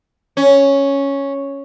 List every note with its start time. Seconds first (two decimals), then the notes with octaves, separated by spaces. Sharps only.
0.37 C#4